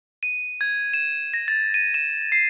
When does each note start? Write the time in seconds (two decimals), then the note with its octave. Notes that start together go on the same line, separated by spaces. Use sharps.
0.23 D#7
0.61 G#6
0.94 E7
1.34 A#6
1.48 A6
1.74 D#7
1.94 E7
2.32 C7